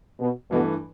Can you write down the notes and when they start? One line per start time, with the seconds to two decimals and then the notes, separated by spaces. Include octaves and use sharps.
0.20 B2
0.51 G2 B2 E3 A3